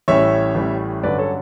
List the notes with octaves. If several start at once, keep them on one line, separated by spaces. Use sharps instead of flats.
A1 A2 G3 C#4 C#5 E5
A1 A2 G3 C#4
G2 D3 F#3 C#4 B4 D5
A4 C#5